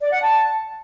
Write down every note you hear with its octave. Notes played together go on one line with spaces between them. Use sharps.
D5
F#5
A5